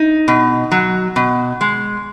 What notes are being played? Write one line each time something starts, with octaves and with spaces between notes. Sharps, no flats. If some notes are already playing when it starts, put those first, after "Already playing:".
Already playing: D#4
B2
F#3
B2
G#3